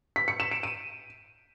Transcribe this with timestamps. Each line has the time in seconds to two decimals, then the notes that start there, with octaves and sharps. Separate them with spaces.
0.16 B6
0.28 C#7
0.40 E7
0.51 D7
0.63 D#7